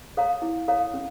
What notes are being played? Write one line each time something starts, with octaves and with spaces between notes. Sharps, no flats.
A4 C#5 F5 A#5
E4
A4 C#5 F5 A#5
C#4